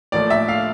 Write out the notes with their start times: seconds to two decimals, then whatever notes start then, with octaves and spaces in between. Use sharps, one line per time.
0.12 A2 F3 A#3 D5
0.30 E5
0.48 F5